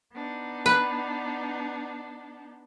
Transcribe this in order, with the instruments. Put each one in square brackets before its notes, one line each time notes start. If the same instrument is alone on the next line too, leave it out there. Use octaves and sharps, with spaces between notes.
[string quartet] B3 D4 D#4
[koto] B4